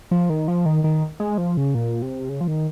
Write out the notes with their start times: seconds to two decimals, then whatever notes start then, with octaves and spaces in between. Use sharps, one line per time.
0.11 F3
0.30 D#3
0.48 F3
0.66 D#3
0.84 D#3
1.20 G#3
1.38 F3
1.57 C#3
1.75 A#2
2.02 C3
2.29 C#3
2.41 F3
2.48 D#3